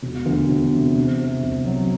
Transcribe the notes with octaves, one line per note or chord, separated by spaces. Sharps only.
E1
D2
E1
C3
C4
C3
C2
F#3